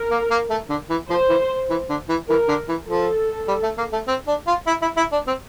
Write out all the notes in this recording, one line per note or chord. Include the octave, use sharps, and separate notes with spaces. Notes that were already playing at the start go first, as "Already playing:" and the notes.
Already playing: A#4
A#3
A#3
A3
D3
E3
F3 C5
E3
E3
D3
E3
E3 A#4
D3
E3
F3 A4
G3
A3
A#3
A3
C4
D4
F4
E4
E4
E4
D4
C4